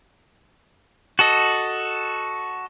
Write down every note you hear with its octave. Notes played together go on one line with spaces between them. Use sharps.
F#4 A4 D#5